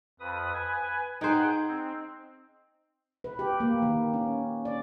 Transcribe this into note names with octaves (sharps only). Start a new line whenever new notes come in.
F2 B4 D#6
B4 G#5
D#4 G#4 C5 F#5 G5
C4
B4
G4
A#3
D#3
C#4
D5